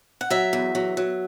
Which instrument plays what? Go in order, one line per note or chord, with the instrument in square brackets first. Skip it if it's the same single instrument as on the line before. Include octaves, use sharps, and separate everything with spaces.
[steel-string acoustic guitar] F#5
F#3 E5
E2
F#3
F#3